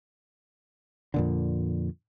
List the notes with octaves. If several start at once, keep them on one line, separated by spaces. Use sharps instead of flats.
F2 A#2 D3